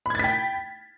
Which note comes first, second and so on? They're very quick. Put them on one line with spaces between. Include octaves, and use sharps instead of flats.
B5 G#6 A6 B6 G5